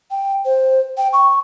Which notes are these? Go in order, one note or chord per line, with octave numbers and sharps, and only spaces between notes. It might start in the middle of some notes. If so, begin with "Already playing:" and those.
G5
C5
G5
C#6